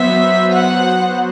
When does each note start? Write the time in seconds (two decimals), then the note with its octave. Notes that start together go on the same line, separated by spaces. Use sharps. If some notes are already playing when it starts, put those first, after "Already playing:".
Already playing: F#3 B3 F#4 C5 E5
0.53 F#5